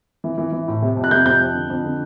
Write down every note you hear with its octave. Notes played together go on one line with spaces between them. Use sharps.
E3
E3
E3
A2
C3
F2
F#6
C3 G6
F2 G6
F2
D3
F2
D3